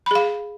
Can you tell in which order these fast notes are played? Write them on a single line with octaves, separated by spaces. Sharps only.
B5 G#4 F5